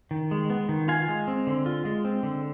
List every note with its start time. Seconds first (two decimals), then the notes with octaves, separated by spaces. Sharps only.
0.11 D#3
0.31 G#3
0.50 B3
0.69 D#3
0.88 F4 F5 G#5
1.08 G#3
1.27 C4
1.47 D3
1.66 F4
1.85 G#3
2.05 C4
2.23 D3